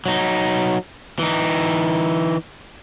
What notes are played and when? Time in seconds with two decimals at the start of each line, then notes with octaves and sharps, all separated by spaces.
0.06 F#3 D#4
1.19 E3 D#4